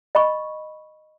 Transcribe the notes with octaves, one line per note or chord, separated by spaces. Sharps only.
D#5 B5 C#6